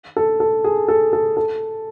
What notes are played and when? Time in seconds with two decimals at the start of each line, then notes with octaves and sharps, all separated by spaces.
0.17 A4
0.40 A4
0.64 G#4
0.88 A4
1.13 A4
1.37 A4